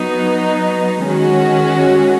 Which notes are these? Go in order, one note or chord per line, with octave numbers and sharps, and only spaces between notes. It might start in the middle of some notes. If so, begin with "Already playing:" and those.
Already playing: F#3 B3 D#4
D#3 G#3 C#4 F#4